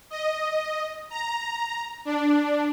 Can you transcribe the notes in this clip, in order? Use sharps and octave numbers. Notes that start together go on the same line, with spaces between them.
D#5
A#5
D4